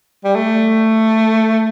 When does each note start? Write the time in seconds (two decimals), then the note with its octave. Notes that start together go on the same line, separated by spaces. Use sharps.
0.24 G3
0.36 A3